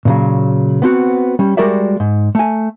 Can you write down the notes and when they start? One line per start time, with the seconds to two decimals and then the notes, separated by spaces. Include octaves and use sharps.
0.05 A#2 C#3 F#3
0.82 B3 C4 F#4
1.39 G3 C#4
1.57 G3 G#3 F#4 A#4 D5 E5
2.00 G#2
2.35 A3 G#5